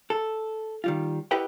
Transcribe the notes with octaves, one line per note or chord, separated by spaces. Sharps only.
A4
D#3 G3 F4
E4 G4 B4 D#5 F#5 G5